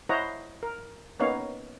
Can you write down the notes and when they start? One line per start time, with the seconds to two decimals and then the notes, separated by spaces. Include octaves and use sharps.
0.09 E4 C5 C#5 D#5 F#5 A#5
0.63 A#4
1.20 A#3 B3 C#4 D#4 C#5 F5